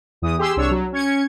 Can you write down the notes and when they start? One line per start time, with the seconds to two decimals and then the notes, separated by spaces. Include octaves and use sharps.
0.22 E2 D#6
0.38 G4 G#4 C6 E6
0.56 C2 D4 C#5 E6
0.71 F#3
0.92 C#4 G#6 C#7